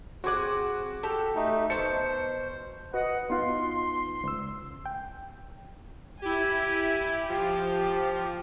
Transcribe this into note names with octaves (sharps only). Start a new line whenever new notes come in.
C4 F#4 G#4 F#5 D6
G4 A4
A3 D#4
B2 C#4 C5 A5 C#7
F#4 B4 D#5 F#5
B3 D#4 F4 C6
C#2 E6
G5
E4 G4 G#5
F3 G4